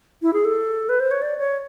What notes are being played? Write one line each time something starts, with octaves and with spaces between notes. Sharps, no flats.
E4
G#4
A4
B4
C5
C#5
D5
C#5